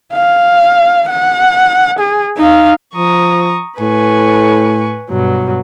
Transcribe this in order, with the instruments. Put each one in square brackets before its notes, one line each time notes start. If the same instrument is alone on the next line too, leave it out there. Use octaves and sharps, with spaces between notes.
[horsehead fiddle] F5
F#5
G#4
D#4 F5
[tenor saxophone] F3 [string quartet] A#5 C#6 D#6
[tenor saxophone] A2 [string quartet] B4 G#5 C#6
[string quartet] G2 B2 F#3